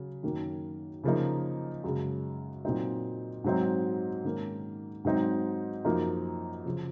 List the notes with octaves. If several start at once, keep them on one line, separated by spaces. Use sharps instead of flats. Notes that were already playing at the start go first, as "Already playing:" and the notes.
Already playing: C#3 F#3
F#2 D#3 A#3 C#4
C#3 F3 A#3 D#4
F#2 C#3 G#3
A#2 F#3 C4 D#4
G#2 F#3 C4 D#4
G#2 D#3 A#3 C#4
G#2 F#3 C4 D#4
F#2 F3 A#3 D#4
C#3 F3